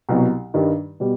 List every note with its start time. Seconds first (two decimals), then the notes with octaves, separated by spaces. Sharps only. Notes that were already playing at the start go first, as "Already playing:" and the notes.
0.09 C2 B2 F#3
0.54 G2 D#3 G3
1.00 B2 G3